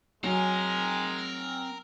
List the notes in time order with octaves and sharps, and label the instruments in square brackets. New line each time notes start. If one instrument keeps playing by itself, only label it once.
[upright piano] F#3 [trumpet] G#3 [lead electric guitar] C4 G#5 [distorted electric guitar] A#4